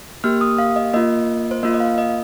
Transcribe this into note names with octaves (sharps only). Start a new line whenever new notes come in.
A#3 G4 F6
D#6
F5
D#5
A#3 F4 D#5
C5
A#3 F4 D#5
D#5
F5
D#5